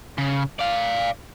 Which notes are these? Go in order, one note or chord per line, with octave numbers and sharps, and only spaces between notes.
C#3
D5 F5